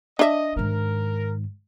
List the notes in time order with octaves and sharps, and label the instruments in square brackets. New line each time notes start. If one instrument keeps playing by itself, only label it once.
[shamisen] D4 E5 [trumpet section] D#5
[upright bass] G#2 D#3 [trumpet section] A#4